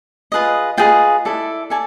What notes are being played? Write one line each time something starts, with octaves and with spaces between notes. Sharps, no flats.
F4 G#4 B4 D#5
F4 G#4 B4 D#5 G5
E4 A4 D5
A4 D5 G#5